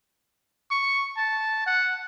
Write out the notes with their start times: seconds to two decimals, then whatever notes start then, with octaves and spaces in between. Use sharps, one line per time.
0.71 C#6
1.17 A5
1.66 F#5